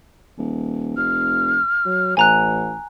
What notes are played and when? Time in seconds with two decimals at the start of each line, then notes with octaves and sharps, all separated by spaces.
0.37 D#1
0.97 F1 F6
1.85 F#3
2.17 A1 F#5 G#5 A#5 F#6